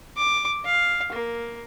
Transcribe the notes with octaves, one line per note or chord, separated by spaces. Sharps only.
D6
F5
A#3